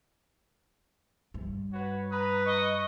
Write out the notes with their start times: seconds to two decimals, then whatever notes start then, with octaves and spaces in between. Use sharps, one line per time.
1.34 G2
1.73 F#4 B4 C#5
2.11 B4 A#5 B5 D#6
2.46 D#5 C#6